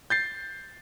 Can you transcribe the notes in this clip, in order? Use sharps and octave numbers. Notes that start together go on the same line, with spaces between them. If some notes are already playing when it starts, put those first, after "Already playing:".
G6 A6 C7